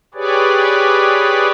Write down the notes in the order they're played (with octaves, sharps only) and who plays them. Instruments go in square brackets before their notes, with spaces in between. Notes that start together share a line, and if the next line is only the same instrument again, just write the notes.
[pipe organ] G4 G#4 B4 C#5 D5